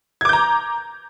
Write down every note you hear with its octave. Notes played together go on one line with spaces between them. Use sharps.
A#5 D6 G6 G#6